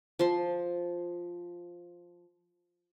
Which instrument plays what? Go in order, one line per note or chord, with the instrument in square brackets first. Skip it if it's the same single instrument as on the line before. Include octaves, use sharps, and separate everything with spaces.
[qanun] F3 C6